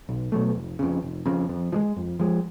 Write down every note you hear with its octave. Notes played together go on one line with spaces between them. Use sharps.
B1
B2 F#3 A3
F1
F2 C#3
F1
F2 C#3
F2
F3
G#3
F2
F3 G#3